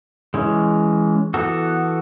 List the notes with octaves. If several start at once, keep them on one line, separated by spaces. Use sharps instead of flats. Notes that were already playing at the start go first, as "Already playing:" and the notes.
E3 G#3 C#4
E3 B3 F#4 A4